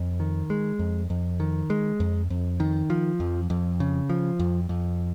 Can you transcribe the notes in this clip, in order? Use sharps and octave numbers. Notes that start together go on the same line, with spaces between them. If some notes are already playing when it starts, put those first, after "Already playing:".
Already playing: F2
D#3
G#3
F2
F2
D#3
G#3
F2
F2
D#3
F3
F2
F2
C#3
F3
F2
F2